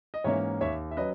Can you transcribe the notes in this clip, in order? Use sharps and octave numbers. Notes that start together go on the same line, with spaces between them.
D#5
G#2 E3 A#3 C#4 C#5 E5
D#2 C#5 E5
E5
F#3 C#4 B4 D#5